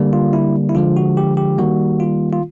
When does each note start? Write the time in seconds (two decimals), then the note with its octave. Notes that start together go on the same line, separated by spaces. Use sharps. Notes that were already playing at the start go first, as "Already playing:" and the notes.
Already playing: D3 G3 A#3
0.13 F4
0.33 E4
0.69 E4
0.75 D3 F3 G#3 F4
0.97 F#4
1.17 G4
1.37 G4
1.58 D#3 G3 A#3 F#4
2.00 F4
2.33 F4